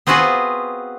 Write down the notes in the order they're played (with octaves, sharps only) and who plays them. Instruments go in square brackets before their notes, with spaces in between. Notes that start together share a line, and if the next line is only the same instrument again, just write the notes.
[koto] B3 C4 F4 F#4 G#4 B4